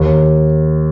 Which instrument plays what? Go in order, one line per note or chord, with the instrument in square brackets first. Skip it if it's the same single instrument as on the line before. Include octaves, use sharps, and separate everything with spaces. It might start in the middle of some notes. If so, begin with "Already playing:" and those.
Already playing: [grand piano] D#2